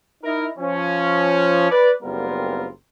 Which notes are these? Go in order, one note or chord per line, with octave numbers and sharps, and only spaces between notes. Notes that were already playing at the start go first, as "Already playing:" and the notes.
D#4 E4 A#4
F3 C#4
B4 D5
F#1 G3 B3 C4 F4 A#4